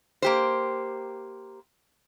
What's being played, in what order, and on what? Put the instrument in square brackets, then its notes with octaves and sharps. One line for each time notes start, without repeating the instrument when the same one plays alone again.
[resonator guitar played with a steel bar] A#3 G4 C5